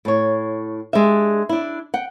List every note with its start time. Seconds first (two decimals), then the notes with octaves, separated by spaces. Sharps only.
0.05 A2 C#5
0.93 G#3 D4 G4 E5
1.49 D4 E4
1.94 F#5 G5